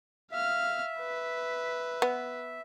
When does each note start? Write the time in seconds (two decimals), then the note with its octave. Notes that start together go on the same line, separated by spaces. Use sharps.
0.31 E5 F5 F6
0.99 B4
2.02 B3